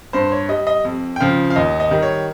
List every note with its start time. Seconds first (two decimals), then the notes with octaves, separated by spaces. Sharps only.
0.13 G2 C5
0.32 C#5
0.49 G3 D#5
0.67 D#5
0.85 F2
1.16 G5
1.20 C#3 F3 F5
1.50 F5
1.56 D#2 D#5
1.80 D#5
1.91 D#3 G3
2.03 C#5